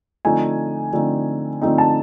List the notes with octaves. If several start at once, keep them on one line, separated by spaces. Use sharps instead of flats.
D3 F3 A3 C4 D#4 G#5
D3 F3 A3 C4 D#4
D3 F3 A3 C4 D#4
A5